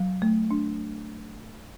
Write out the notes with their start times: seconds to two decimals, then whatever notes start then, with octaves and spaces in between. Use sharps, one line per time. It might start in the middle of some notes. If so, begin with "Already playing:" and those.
Already playing: F#3
0.22 A3
0.51 D4